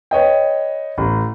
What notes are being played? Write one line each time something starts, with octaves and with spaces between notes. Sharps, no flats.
B4 C#5 D#5 G5
A1